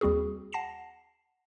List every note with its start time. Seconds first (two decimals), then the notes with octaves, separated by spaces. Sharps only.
0.01 D#2 G3 C4 F#4 G#4
0.53 F#5 A5 A#6 C7 E7